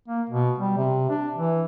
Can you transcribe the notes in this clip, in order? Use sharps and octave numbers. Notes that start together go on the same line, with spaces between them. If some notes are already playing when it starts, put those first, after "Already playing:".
A#3
B2
G3
C3
D4
E3